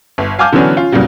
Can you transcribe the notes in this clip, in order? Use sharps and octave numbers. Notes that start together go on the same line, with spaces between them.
G1
F5 G#5 A5 D6 F6 G6
D3 E3 F#3 B3 C#4 D4
C#4 F4
E2 A#2 C#3 F#3 G3